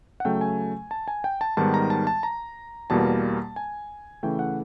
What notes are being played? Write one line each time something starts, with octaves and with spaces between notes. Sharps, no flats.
F#5
C#3 F#3 A3 G5
G#5
A5
G#5
G5
A5
G#2 D#3 G3 B3 A5
A#5
A5
A5
A#5
E2 B2 G3 A#3 A5
G#5
C#3 E3 A3 G5
F#5